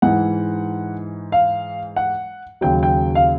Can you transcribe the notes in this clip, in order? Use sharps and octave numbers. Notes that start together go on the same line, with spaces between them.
G#2 E3 F#5
F5
F#5
D#2 C#3 F#3 G5
G5
F5